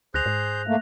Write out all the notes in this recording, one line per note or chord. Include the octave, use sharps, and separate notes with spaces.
D2 G#4 C5 F#6 G6 A#6 F7
G#2
A3 A#3